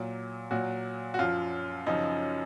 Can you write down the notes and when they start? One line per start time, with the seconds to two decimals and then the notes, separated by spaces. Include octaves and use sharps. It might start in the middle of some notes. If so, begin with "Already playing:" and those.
Already playing: A#2 F#3
0.51 A#2 F#3 F#4
1.14 F#4
1.19 F#2 F3 F4
1.86 F#2 C#3 F3 D#4